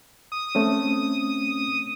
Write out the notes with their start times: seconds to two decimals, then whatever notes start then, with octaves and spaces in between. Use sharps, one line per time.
0.32 D#6
0.55 A3 C4 C#4